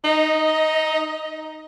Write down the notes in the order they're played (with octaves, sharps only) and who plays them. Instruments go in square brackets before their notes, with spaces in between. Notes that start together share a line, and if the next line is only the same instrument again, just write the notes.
[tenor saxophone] D#4 [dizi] D#5